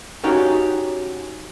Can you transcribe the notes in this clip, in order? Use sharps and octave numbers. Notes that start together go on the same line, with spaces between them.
C#4 D#4 F#4 G4 C#5 D5